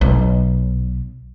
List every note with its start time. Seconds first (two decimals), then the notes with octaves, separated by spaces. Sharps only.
0.01 B1